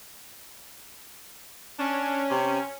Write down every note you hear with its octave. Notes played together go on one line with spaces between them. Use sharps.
C#4 D4
C3